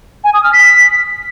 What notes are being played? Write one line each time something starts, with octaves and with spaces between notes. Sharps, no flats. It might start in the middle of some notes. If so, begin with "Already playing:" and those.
G#5
D#6
F6
B6